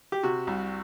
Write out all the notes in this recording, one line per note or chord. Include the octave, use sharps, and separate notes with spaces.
G4
C3 F#4
C2